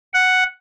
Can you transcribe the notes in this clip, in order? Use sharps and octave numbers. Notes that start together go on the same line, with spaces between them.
F#5